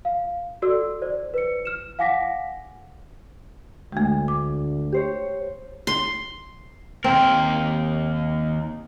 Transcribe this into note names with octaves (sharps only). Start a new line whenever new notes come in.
F5
F#4 A4 D5 E6
C5 D5
B4 C#7
F6 E7
F5 F#5 G#5 D6 A#6 B6
D2 G#3 A3
D6
G4 C5 C#5
C6
D#2 C4 A#4